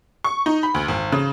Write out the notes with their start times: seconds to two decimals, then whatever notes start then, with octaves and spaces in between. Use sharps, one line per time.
0.24 C#6
0.46 D#4
0.63 B5
0.74 D2
0.88 G#1
1.12 C#3